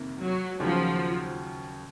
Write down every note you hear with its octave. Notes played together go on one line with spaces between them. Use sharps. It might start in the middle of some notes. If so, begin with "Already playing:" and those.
Already playing: F2 C3 D#3 A#3
F#3
D#2 C#3 F3 F#3